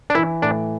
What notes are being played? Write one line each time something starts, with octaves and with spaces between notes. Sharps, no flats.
D4
E3 E4
A2 D4